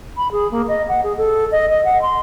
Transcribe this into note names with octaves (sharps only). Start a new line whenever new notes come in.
B5
G#4
A#3
D#5
F#5
G#4
A4
D#5
D#5
F#5
C6